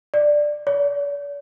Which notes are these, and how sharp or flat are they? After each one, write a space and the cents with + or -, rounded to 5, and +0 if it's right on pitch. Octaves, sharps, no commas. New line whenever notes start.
D5 +10
D5 -45